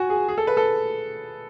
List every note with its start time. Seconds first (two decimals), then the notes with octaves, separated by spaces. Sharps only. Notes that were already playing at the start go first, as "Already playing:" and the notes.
Already playing: F#4 G#5
0.10 G#4
0.28 G#4
0.38 A4
0.47 B4
0.57 A4